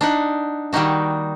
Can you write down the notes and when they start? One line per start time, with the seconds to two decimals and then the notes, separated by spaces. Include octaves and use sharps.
0.01 D4 D#4 F#5
0.73 D#3 G3 A#3 D#4 F#4